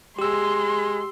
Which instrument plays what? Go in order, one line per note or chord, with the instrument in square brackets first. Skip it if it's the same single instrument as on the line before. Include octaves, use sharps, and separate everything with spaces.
[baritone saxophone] G#3 [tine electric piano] G4 E6 [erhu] C6